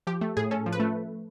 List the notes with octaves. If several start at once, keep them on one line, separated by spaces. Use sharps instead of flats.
F3 G4
A3
A2 G#4
C#4 A4
F3
B4
A3